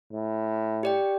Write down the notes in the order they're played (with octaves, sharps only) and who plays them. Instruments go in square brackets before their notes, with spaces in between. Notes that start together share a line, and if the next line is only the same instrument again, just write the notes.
[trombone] A2
[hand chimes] G4 D5 G5